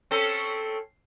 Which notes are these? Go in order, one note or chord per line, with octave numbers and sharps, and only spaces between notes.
C4 C#4 A4